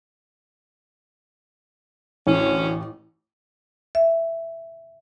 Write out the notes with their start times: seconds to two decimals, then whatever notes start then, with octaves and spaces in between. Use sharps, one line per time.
2.27 A1 D2 C#4
3.95 E5